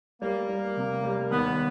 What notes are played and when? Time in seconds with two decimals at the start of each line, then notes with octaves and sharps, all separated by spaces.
0.22 G3 A#3
0.49 G3
0.77 C3
1.04 G3
1.31 D#2 B3